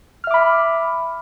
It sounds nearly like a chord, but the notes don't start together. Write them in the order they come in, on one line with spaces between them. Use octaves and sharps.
F6 E5 D6 B5